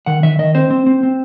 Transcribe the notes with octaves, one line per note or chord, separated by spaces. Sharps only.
D#3 F#5
D#3 E5
D#3 D#5
C4 C5
C4
C4
C4